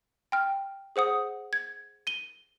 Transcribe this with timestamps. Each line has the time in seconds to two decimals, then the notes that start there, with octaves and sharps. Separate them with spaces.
0.32 G5 F6
0.96 G#4 C5 F#5 D#6
1.53 G#6
2.07 D#7 G7